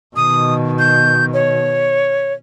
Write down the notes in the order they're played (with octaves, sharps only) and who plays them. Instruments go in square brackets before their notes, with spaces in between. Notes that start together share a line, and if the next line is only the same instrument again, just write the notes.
[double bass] B2 D#3 [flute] D#6
[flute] G6
C#5